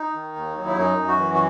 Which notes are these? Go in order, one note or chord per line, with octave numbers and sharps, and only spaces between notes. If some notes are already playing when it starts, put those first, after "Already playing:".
Already playing: D#4
D#3
D#2
F#3
E4
F#2 D#4
F#2
F#4
E3
F#4